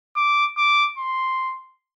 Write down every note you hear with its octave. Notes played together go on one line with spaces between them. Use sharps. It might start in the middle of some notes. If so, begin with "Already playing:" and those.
D6
D6
C6